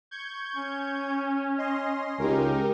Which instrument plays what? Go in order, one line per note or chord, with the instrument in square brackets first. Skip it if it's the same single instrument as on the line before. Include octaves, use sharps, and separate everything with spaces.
[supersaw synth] C#6 G6 G#6
[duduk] C#4
[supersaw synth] D#5 C6
[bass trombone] C#2 [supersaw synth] D#4 G4 A#4